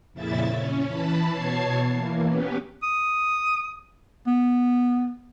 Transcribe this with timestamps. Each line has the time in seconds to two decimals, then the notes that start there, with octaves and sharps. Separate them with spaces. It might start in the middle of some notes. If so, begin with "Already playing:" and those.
0.13 F2 A#2 C#3 E4 E5 A6
0.50 C#4
0.87 E3 A5 B5
1.31 B2 C#5 A5 G#6 C7
1.92 E3 A#3
2.27 B3 C#4 G4 B4
2.83 D#6
4.27 B3